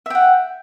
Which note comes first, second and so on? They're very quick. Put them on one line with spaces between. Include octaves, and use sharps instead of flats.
E5 G5 F#5